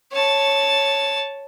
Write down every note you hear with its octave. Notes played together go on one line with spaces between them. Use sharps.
C#5 A5